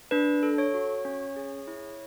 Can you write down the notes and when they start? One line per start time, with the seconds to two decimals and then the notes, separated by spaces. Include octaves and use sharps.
0.11 D4 B4
0.43 A4
0.58 C#5
0.74 F#4
1.05 C#4
1.36 G#4
1.67 E4